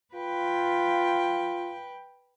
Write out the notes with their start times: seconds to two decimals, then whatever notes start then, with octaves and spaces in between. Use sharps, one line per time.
0.14 F4 B4 G5